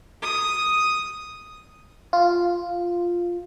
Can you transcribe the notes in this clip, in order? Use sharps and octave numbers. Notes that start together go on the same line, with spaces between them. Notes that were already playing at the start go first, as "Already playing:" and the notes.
D#6
F4